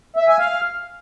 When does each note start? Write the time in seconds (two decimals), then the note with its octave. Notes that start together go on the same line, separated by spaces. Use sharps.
0.16 E5
0.27 G#5
0.38 F5